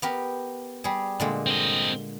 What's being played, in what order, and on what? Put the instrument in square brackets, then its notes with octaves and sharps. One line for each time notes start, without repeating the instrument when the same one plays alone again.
[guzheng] B3 G4 A#4
G3 G#4
A#2 D3 G#3
[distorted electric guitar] C4 D#5